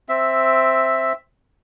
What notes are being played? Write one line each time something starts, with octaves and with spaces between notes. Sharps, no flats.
C4 E5